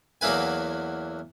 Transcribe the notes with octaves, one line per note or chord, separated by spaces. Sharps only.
E2 F#3 A#3 E4 B4 G#5